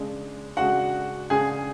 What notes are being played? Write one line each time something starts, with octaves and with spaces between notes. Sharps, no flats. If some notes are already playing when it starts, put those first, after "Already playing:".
Already playing: C#3 G#3 D4
C#3 G#3 D4 F#4 F#5
C#3 G#3 D4 G#4 G#5